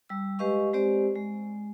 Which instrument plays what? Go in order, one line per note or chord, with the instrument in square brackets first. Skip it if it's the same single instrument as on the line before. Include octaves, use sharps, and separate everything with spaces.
[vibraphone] G3 E6
G#3 G4 B4 D#5 F5 C#6
G#3 C4 G4 C5 D5
G#3